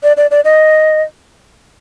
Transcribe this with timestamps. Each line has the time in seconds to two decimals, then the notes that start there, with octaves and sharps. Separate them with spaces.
0.03 D5
0.17 D5
0.31 D5
0.45 D#5